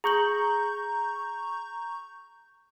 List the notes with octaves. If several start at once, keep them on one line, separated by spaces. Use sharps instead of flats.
G#4 A#5 C#6 G6 F#7